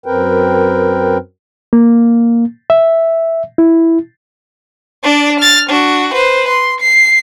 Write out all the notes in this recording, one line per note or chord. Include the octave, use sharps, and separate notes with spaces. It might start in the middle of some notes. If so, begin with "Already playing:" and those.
F#2 C4 A#4 B4 G5
A#3
E5
E4
D4 D5
F6 A6
D4 F#4
B4 C5
C6
C7